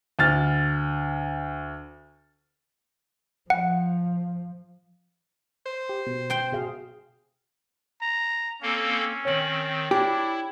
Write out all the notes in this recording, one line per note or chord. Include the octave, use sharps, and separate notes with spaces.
D2 F6 A6
F3 F#5
C5
G4
B2
G5 C6
F#4 G#4 F5
A#5
A#3 C4 C#4 A4
D#3 C4 C#5 F#7
D4 E4 G4